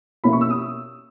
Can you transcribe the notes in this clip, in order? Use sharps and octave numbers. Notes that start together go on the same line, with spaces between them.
B2 A#3 C#4 E4 B5
C#6
E6
D#6